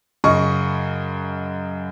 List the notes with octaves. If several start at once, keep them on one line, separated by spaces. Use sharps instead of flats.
F#2 C#3 D#5 C#6